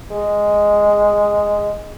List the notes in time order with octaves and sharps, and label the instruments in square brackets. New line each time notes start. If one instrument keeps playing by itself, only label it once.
[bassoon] G#3